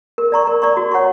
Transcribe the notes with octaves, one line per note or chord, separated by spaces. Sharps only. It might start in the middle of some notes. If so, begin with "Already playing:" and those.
A#4
D5 A#5 C#6
A#4
D5 A#5 C#6
F#4
C#5 F#5 A#5 C#6